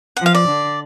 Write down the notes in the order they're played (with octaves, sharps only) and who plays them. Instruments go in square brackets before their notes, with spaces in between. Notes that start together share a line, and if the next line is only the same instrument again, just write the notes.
[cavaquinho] F#5
[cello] F3
[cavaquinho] F5
D5
[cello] D3